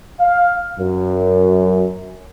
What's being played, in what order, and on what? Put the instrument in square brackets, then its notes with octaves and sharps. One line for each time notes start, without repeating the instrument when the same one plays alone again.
[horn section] F5
F#2